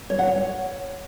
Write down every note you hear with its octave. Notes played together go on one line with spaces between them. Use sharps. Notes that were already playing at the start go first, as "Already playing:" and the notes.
C#5
F#5
C#5